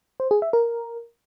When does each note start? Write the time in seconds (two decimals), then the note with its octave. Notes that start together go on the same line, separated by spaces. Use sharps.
0.20 C5
0.31 G#4
0.42 E5
0.53 A#4